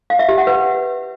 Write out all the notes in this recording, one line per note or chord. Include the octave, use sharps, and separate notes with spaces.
F5
E5
G4
F#5
B4